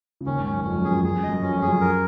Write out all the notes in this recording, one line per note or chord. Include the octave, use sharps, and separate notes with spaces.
C#3
D#2 D#3 C#4
G#1 G#2
C#4
F#2
F2 C#4
F#2
G#4
F#2
F#2 G#4
F#2
D#5
F#2
F2 C#4
F2
G#4
F#2
A#4